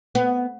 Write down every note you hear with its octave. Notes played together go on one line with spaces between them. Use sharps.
B3